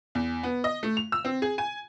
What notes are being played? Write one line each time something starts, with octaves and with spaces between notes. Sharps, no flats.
E2
B3
D#5
A3
F7
E6
C4
G#4
G#5